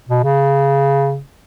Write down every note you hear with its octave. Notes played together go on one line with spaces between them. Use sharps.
B2
C#3